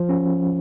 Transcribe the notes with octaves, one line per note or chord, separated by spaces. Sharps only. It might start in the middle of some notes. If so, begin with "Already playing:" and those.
Already playing: F3
C#4